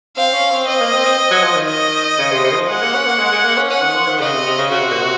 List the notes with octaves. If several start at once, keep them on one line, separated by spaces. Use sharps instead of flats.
C4 F5
C#4
C4
C4 D#5
A#3
C4
C4
C4
F#3
F3
D#3
D#5
C#3
C3
C3
D#3
F3
G#3 F#5
A#3
C#4
A#3
G#3
G#3
A#3
C#4
C#4 F#5
D#3
F3
D#3
C#3 D#5
C3
C3
C#3
C#3 F#4
C3
A#2
C3